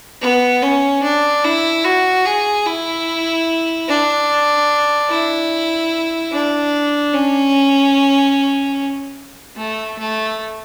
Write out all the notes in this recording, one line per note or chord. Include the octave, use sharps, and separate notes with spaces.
B3
C#4
D4
E4
F#4
G#4
E4
D4
E4
D4
C#4
A3
A3